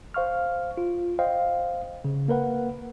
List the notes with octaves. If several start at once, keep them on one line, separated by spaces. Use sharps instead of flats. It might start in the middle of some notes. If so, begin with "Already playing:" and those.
C5 F5 C#6 F6
F4
C5 D#5 F5 G5
C#3
A#3 A#4 B4 F#5